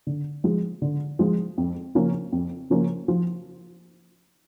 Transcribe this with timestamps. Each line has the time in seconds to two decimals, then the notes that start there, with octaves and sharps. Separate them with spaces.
0.07 D3
0.44 F3 G#3
0.82 D3
1.19 F3 G#3
1.58 F2
1.95 C#3 F3 A#3 C#4
2.32 F2
2.70 C#3 F3 A#3 C#4
3.08 F3